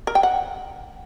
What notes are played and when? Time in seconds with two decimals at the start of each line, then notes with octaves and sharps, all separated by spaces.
0.07 A#4
0.15 G5
0.23 F#5